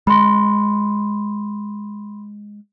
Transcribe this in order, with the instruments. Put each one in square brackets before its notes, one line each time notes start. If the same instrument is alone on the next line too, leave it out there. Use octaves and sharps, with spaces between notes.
[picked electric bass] G#3 [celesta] B5 C6